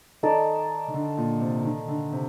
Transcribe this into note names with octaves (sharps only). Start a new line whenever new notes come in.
D#3 D#4 A4 D5
D#3
D3
A#2
C3
D#3
D3
C3